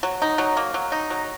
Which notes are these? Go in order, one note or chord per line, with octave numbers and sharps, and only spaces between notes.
F#3
D#4
F#3
A#3
F#3
D#4
F#3